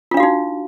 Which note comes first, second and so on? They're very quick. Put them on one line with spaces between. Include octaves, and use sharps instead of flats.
F4 D4 F5 F#4 D#4